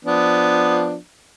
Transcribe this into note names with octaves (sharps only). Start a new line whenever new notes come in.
F3 B3 D4